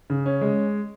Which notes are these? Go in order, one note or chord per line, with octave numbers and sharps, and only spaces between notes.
C#3
C#4
G#3